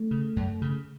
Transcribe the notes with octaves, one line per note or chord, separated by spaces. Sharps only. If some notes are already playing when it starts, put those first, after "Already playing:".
Already playing: A3
C#3
F#2
C#3